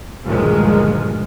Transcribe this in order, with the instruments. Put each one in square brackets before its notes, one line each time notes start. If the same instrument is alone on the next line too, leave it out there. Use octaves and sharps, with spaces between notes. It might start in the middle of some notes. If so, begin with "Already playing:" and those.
[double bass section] D2 G2 A#2 D#3 F3 G#3